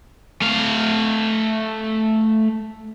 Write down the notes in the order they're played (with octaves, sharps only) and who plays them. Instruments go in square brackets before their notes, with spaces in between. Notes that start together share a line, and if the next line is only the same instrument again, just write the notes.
[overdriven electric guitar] A3 F5